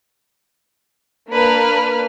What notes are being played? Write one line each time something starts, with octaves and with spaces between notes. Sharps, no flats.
A#3 D4 B4 F6